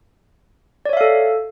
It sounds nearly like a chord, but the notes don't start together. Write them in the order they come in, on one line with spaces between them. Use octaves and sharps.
D5 C#5 E5 F5 A4